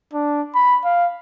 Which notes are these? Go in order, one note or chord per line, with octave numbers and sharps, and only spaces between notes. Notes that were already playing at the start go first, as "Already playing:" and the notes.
D4
B5
F5